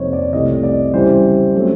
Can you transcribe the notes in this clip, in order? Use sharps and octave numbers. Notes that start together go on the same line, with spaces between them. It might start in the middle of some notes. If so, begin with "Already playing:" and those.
Already playing: F2 C3 F3 A#3 D#4 C5 C#5
D5
C2 C3 E3 A3 D#5
D5
C#3 E3 G3 C5
C#3 F#3 A3 C4